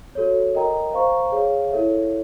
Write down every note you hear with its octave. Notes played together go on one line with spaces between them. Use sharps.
F#4 A4 C#5
A#4 D#5 G5 A#5
C5 F5 A#5 C#6
G#4 C#5 F5
E4 A4 C#5 E5